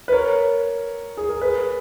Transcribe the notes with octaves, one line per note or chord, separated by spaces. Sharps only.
B4
A#4 C#5
G#4
A#4
G#4 B4